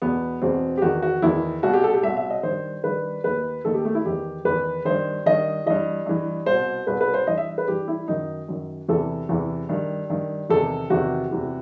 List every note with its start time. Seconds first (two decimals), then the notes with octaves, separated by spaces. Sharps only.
0.02 E2 B2 B3
0.42 E2 B2 C4
0.78 G4
0.82 E2 D#3 F#4
1.02 F#4
1.22 E2 D#3 E4
1.63 C2 B2 F#4
1.73 G4
1.84 A4
1.93 G4
2.03 C2 B2 E5
2.17 E5
2.30 D#5
2.43 G2 D#3 C5
2.84 G2 D#3 B4
3.24 D#2 D#3 B4
3.65 D#2 D#3 A4
3.74 G4
3.85 A3
3.95 E4
4.05 E2 D#3 G4
4.45 E2 D#3 B4
4.85 G2 D#3 C5
5.26 G2 D#3 D#5
5.66 G2 E3 D#5
6.06 G2 E3
6.46 C2 B2 C5
6.87 C2 B2 B4
7.01 B4
7.14 C5
7.27 G2 E3 D#5
7.37 E5
7.58 B4
7.68 G2 E3 G4
7.88 E4
8.08 F#2 D#3 D#4
8.48 F#2 D#3
8.89 E2 C3 E3 A4
9.29 E2 C3 E3
9.69 G2 D#3
10.10 G2 D#3
10.50 E2 C3 D#3 A4
10.90 E2 C3 D#3 F#4
11.31 E2 C3 E3